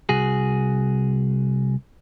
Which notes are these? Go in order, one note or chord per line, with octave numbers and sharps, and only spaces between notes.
C2 F#4 G#4